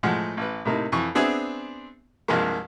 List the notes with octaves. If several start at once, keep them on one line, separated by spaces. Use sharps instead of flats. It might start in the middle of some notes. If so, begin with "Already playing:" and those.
A2 F3 G#3 F#5
A1 B4
A2 C3 A#3 D#4 E4
F2 E3 C#6
B3 C4 D4 G#4 E5 G#5
C2 G2 F3 G#3 A#3